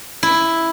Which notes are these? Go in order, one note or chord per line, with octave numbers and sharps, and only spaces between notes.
E4